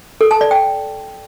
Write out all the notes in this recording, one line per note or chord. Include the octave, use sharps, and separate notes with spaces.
A4
A5
D5
G5